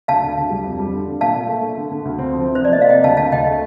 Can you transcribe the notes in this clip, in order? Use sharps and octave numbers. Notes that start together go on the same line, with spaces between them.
D2 F5 A5
D3
D2
G3
F2
G3
D3
D3
A#2 F5 A5
A#2
A3
A3
D3
D3
D2
C4
F3
C3
C5
F3 D5
A#3 D#5
F5
C3 D#5 G5
D2 F5 A5
D2 F5 A5
D2 D#5 G5
A3